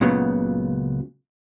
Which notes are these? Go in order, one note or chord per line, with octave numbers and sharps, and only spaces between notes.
C#2 A#2 C#3 F#3 B3